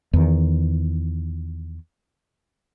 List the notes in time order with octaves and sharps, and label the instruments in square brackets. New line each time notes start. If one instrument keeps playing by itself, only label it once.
[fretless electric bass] E2 D#3